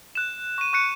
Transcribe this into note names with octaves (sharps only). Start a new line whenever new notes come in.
F#6 E7
C#6 D#7
C#6 F#6 C#7